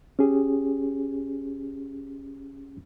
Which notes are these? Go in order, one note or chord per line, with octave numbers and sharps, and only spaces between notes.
C#4 G4 G#4